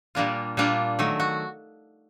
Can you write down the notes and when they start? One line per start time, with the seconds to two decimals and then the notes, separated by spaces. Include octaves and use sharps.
0.15 A#2 G3 A#3 D4 F4
0.57 A#2 G3 A#3 D4 F4
0.99 D#3 F#3 A3
1.20 F#4